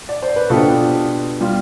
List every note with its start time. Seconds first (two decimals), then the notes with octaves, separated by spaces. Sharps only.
0.09 D5
0.22 C5
0.36 B4
0.50 B2 B3 D4 F4 G4 A4
1.41 G3 B3 F4